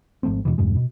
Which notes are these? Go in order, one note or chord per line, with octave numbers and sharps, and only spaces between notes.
G#1 F3 A3 C4
E2 G2 B2 E3
E2 G2 B2 G#3
B2